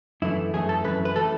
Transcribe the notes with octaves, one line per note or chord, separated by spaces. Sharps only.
F#2 E3 A3 E4
F#2 E3 A3 G#4
A4
F#2 E3 A3 B4
B4
E3 A3 A4